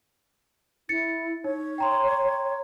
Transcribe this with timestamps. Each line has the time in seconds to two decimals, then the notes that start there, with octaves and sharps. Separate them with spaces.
0.89 E4 A6 C#7
1.44 D#4 C#5
1.78 G5 A#5 C6